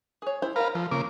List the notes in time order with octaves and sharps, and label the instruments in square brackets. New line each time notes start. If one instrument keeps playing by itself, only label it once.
[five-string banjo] G#4 C#5
E4 C5 B5
[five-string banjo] A#4 F#5 [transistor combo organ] B4 F5 A#5
[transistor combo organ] F3 [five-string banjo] A4
[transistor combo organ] C#3 A#3 D6